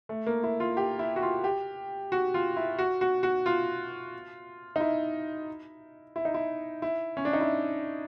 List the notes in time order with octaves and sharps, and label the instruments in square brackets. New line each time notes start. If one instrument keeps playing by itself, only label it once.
[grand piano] A3
A#3
E4
F4
G4
E4
F#4
F4
G4
F#4
F4
E4
F#4
F#4
F#4
F4
D#4
E4
E4
D#4
E4
E4
C#4
D4
D#4
E4